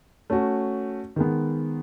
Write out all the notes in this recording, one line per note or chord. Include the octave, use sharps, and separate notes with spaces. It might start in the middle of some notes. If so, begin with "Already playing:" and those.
A3 C#4 F#4
D#3 G#3 B3